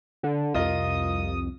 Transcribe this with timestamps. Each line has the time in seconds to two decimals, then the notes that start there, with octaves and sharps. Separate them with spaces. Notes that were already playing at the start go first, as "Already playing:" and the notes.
0.23 D3
0.54 C2 F2 F4 A#4 D#5 D#6